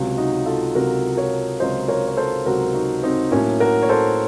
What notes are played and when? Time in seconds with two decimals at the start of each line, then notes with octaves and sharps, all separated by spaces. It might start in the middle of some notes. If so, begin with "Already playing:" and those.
Already playing: C#2 C3 F#3
0.17 D#4 F#4
0.46 F4 A4
0.75 C#2 C3 F#3 F#4 A#4
1.17 A#4 C#5
1.60 C#2 C3 F#3 C5 D#5
1.88 A#4 C#5
2.08 C#5
2.17 A4 C5
2.46 C#2 C3 F#3 F#4 A#4
2.74 D#4 F#4
3.03 C4 D#4
3.32 A2 F#3 A#3 C#4
3.60 F#4 A#4
3.83 C#5
3.89 A4 C5